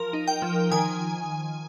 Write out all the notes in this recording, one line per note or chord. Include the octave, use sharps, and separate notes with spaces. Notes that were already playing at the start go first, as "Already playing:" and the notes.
Already playing: F3 A#4
D#4
G5
F3
D#3 G#5